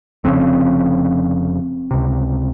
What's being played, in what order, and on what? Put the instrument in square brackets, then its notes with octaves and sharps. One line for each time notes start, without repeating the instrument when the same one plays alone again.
[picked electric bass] F1 F2 C#3 C4
C#2 C3